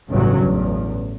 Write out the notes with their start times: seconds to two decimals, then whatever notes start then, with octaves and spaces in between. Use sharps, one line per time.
0.11 A1 E2 G2 C#3 F#3
0.43 A1 E2